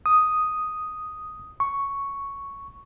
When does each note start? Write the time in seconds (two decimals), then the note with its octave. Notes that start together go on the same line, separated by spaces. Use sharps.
0.06 D#6
1.60 C#6